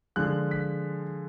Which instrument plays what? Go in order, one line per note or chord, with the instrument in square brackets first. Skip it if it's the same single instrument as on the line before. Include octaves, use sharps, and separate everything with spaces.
[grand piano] D3 F3 G#3 F#6
B6